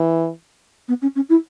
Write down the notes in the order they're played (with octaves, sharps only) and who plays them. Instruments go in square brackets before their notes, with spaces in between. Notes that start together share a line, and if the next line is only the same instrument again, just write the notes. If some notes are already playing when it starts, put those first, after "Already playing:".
Already playing: [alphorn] E3
[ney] B3
C#4
C#4
E4